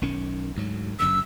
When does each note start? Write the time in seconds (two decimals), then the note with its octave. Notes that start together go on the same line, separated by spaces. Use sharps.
0.02 B1 D#3 C#4
0.55 D2 G#2 F#3
1.00 F#1 F#2 D3 E6